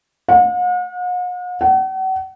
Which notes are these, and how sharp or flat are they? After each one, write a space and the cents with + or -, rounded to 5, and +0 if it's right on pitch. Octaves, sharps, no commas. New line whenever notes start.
F#5 -45
F#5 +40